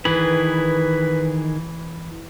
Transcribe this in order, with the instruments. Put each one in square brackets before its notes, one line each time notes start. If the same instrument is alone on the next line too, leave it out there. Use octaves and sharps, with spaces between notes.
[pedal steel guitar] D#3 G#4 B5 [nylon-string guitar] E3 [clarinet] B4